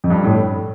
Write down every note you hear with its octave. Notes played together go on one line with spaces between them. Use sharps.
F2
G2
A2